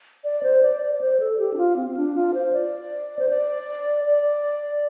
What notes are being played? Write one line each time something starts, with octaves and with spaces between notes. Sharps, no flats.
D5
C5
D5
D5
D5
C5
A4
G4
D4
F4
C4
C4
D4
F4
C5
D5
C5
D5
D5